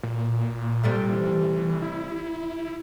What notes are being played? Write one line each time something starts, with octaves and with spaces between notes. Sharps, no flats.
A#2
C3 G3 A3
E3
E4